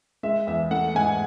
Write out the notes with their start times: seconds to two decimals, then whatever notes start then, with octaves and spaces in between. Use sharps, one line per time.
0.23 G#3 E5
0.47 E2 E5
0.71 A3 F#5
0.95 G#2 G#5